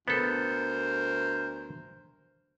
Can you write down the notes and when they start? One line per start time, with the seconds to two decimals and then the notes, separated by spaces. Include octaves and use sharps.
0.08 D2 B3 A4 A#4 C5